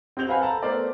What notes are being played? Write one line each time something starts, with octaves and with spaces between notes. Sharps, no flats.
C4 F#4 G6 F7 F#7
B4 C5 F5 F#5 G#5 B5
A4 A5 A#5
A3 B3 A#4 C5 D5